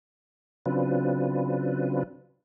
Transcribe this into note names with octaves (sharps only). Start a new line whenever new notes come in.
C#3 F#3 C4 D4 F4 B4